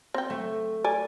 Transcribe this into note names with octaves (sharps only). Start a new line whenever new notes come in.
C4 G5
A3
D5 G#5